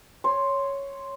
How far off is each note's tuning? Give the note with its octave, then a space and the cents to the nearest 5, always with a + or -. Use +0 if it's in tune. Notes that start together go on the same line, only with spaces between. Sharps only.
C#5 +0 C6 +0